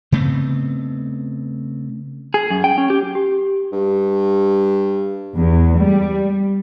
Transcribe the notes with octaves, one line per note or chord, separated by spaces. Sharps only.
C#3 A3 B3 C4
G#4
F#2
G5
C#4
G4
G4
G2
E2
G3